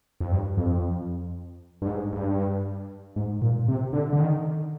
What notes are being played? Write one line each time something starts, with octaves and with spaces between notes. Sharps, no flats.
F2
G2
F2
G2
G#2
G2
G#2
A#2
C3
D3
D3
D#3